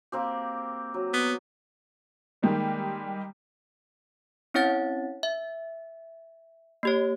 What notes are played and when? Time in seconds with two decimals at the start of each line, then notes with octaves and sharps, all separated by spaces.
0.12 A#3 C4 G4
0.94 F#3
1.14 B3
2.42 D#3 G3 G#3 A#3
4.54 C4 C#4 E4 C#5 F#5 A6
5.23 E5
6.83 A#3 G4 C#5